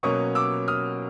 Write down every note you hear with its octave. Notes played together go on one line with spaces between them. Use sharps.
B2 F#3 A#3 C#4 C#6 D#6
D6 E6
D#6 F6